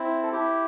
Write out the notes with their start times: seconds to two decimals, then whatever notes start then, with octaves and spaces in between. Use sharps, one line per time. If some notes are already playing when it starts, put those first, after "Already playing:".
Already playing: C4 E4
0.23 A4
0.32 E4 G4